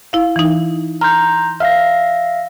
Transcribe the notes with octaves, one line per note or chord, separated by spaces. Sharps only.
E4 F5
E3 D#4
A#5 C6 F6 G6
E5 F5 F6 A#6